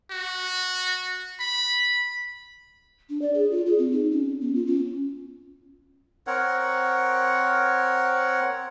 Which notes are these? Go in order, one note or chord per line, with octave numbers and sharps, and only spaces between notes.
F#4
B5
D4
D5
G#4
F4
G#4
C4
D#4
C#4
B3
F4
C#4
C4 A#4 C#5 F#5